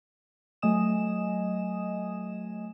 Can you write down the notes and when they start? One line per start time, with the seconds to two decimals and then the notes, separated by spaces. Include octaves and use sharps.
0.62 F#3 A3 D#5 G#5 D#6 E7